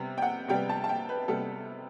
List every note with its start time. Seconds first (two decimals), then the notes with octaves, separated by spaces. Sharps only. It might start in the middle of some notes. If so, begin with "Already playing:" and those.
Already playing: C3 G3 B3
0.18 G5
0.22 F#5
0.48 C3 G3 B3 G5
0.69 A5
0.84 A5
0.89 G5
1.09 B4
1.28 C3 G3 B3 A4